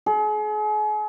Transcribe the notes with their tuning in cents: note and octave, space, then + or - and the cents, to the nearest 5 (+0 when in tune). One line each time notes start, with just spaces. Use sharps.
G#4 +40